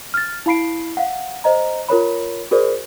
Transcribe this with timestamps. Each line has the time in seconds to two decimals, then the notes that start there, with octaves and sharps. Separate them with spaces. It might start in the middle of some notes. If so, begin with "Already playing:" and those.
0.14 F6 A6
0.46 E4 F5 B5 C7 D7
0.97 F5 F#5
1.44 C5 D#5 A#5
1.89 F4 A#4 C#5 B5
2.51 F#4 G#4 A#4 C5 D5